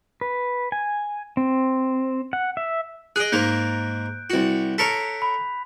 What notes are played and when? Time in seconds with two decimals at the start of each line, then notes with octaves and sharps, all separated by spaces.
0.21 B4
0.72 G#5
1.37 C4
2.33 F#5
2.57 E5
3.16 G#4 D#5 F#6 D7
3.32 G#2 A#3 G6
4.30 C2 F#4
4.78 A4 A#4 C#5 B6
5.22 B5